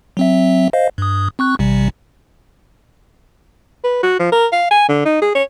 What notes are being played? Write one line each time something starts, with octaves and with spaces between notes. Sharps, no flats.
F#3 C4 E5
C5 D#5 F5
G2 D#6
C4 C#6 F#6
A1 C3 G3
B4
F#4
F3
A#4
F5
G#5
D3
D#4
G#4
C#5